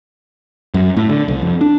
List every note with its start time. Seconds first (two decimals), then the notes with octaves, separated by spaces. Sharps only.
0.74 F#2
0.96 A2
1.09 D3
1.28 C2
1.42 F2
1.61 D4